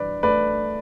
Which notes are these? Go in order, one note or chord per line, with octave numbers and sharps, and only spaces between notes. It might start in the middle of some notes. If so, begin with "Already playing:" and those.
Already playing: G2 E3 D4 B4 D5
A3 B4 D5